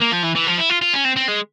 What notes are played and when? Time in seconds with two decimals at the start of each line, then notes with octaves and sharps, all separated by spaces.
0.02 A#3
0.13 F3
0.24 E3
0.36 E3
0.47 F3
0.58 E4
0.70 F4
0.82 F4
0.93 C#4
1.05 C4
1.16 C4
1.28 G#3